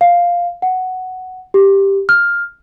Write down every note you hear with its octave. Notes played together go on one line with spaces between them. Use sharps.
F5
F#5
G4
F6